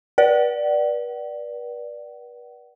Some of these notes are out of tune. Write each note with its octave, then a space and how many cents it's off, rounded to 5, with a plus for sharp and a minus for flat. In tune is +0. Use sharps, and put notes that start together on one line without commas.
B4 -35 D5 +5 F#5 +35